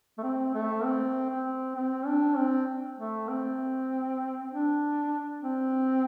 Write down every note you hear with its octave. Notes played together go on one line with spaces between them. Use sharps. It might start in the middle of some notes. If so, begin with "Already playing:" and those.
A3
C4
A3
C4
C4
C4
D4
C4
A3
C4
D4
C4